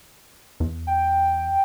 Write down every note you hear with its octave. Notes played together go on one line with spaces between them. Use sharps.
E2
G5